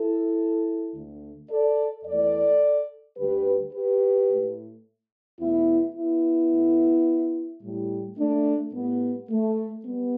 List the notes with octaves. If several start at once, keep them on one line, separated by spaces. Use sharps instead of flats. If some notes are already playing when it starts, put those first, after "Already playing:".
Already playing: E4 A4
D2 D3 A3
A4 D5
E2 E3 A3 A4 D5
D2 D3 G3 G4 B4
G4 B4
A2 A3
E2 B2 A3 B3 E4
B3 E4
A2 A3
A2 G3
A3 D4
A2 G3 B3
A3
G3 B3